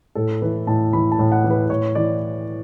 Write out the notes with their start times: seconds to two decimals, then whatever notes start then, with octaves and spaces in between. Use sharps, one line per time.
0.15 A2 A4
0.42 E3 B4
0.67 A2 A5
0.93 E3 B5
1.12 A5
1.19 A2
1.32 F#5
1.44 E3
1.50 B4
1.69 A2 C#5
1.95 E3 D5